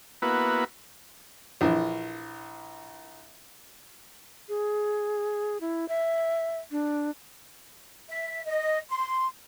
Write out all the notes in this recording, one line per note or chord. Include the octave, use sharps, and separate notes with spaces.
A#3 B3 E4 F#4 B4
A#1 E3
G#4
E4
E5
D4
E5
D#5
C6